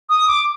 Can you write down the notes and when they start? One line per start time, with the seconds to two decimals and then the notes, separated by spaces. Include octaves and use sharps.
0.10 D#6
0.28 D6